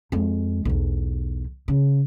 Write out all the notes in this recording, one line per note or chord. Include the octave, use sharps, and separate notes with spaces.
F2 G#3
B1 E2
C#3